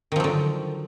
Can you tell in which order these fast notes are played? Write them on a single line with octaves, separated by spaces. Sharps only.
D#3 F3 F#3 D3